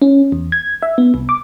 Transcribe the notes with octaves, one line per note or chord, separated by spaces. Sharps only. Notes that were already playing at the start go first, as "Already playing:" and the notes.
C#4
E2
G#6
E5
B3
C2
D6